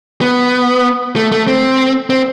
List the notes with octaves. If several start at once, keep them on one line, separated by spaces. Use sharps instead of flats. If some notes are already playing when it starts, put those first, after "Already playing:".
B3
A3
A3
C4
C4